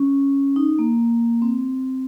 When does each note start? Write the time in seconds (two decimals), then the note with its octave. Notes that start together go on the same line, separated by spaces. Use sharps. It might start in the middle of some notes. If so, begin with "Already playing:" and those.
Already playing: C#4
0.56 D#4
0.79 A#3
1.42 C4